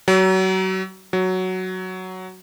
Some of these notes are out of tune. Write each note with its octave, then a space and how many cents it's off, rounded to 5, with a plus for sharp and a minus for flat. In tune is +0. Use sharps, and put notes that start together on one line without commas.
F#3 +30
F#3 +5